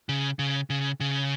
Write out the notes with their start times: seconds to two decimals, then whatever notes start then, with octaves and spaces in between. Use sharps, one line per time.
0.09 C#3
0.39 C#3
0.70 C#3
1.00 C#3